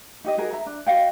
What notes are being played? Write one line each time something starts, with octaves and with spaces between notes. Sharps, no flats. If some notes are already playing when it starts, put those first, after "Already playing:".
D#4 G4 D#5
D#4 F#4 G#4 A#4
E5 A#5
D4
F#4 D#5 F5 G5